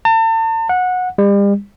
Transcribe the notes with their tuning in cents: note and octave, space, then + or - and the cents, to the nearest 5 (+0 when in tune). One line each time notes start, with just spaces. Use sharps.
A5 +40
F#5 -20
G3 +40